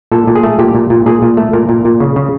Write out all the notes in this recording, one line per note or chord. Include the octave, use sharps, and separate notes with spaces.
A#2 A4
A#2
G#4
A3
A#2 G4
A#2
A#2
A#2 G#4
A#2
A3
A#2 A#4
A#2
A#2
C#3
C#3